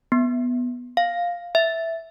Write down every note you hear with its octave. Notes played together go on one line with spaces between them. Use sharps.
B3
F5
E5